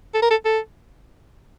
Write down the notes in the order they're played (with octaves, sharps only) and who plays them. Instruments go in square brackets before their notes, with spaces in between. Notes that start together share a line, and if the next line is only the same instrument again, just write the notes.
[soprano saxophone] A4
A#4
A4
A4